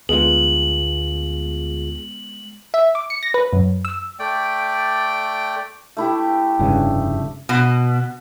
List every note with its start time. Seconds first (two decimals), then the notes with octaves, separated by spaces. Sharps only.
0.09 D2 G#3 B3 F4 G#4 F#7
2.74 E5
2.95 D6
3.10 C#7
3.23 A#6
3.34 B4
3.53 F#2
3.85 E6
4.19 A3 D5 G5
5.97 A3 E4 G4
6.59 F1 G2 C#3 C#4 G#4
7.49 B2